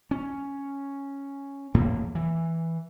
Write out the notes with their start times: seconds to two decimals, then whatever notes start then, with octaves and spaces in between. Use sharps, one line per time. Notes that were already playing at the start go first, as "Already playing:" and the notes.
0.11 C#4
1.74 E2 A2 A#3
2.15 E3